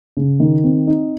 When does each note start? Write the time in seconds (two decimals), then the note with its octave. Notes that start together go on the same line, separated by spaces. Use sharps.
0.17 C#3
0.40 D#3
0.64 C4
0.87 D#4